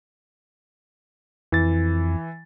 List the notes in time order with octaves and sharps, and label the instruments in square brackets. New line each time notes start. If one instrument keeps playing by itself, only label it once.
[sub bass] F2 [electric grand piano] E3 A6